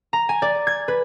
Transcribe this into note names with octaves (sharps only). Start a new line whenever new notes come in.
A#5
G#5
D5
G#6
B4